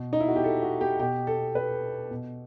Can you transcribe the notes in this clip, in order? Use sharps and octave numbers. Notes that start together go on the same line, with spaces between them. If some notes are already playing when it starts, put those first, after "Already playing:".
Already playing: B2
D#4
E4
F#4
G4
A4
F#4
G4
B2 G4
A4
B4
B2